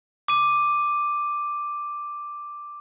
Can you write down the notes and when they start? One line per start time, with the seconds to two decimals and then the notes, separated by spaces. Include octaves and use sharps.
0.28 D6 D#7